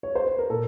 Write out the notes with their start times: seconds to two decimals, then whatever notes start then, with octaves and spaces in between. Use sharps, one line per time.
0.03 C#5
0.15 C5
0.27 B4
0.39 A#4
0.50 A#2 A4